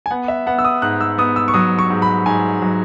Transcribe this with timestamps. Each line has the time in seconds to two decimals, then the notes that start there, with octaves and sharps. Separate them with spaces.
0.06 G#5
0.11 B3 F#5
0.28 E5
0.46 B3 F#5
0.59 E6
0.65 D#6
0.82 G#2 F#6
1.01 E6
1.18 B3 D#6
1.36 E6
1.48 C#6
1.54 F#3 D#6
1.79 C#6
1.90 G#2
2.02 B5
2.26 G#2 G#5
2.62 F#3